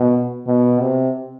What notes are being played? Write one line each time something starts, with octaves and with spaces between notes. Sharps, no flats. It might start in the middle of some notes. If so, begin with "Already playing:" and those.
Already playing: B2
B2
C3